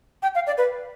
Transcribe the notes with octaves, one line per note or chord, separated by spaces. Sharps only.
G5
F5
D5
B4